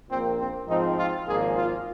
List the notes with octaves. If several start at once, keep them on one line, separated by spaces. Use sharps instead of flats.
A#1 A#2 A#3 C4
C4
G#2 F3 C4 D#4
F4
G#1 G#2 F3 A#3 G#4
F4